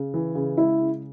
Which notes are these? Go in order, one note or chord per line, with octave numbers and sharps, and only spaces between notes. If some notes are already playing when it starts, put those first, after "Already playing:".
Already playing: C#3
E3
C#3
G#3 E4
C#3